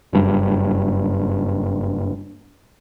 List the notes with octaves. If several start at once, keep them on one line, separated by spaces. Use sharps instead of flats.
F#1 G2